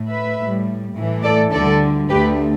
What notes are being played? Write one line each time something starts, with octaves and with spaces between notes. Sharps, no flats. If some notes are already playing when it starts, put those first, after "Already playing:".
Already playing: A2 A3
B4 E5
A2 G3
A2 E3 A3
A4 D5
D2 D3 G3 A4 D5
D2 D3 A3 G4 B4